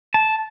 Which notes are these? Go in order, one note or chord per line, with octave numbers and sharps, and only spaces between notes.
A5